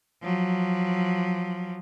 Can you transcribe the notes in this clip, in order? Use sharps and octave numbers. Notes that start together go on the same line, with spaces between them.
F3 F#3